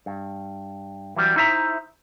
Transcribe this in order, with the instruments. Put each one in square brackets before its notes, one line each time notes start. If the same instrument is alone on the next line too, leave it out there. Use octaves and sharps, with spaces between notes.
[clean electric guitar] G2
E3 F#3 G3
D#4 E4 C5 E5 A5 A#5